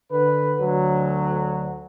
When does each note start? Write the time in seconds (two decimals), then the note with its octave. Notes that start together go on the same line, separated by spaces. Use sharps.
0.11 D3 B4
0.60 D2 D3 F#3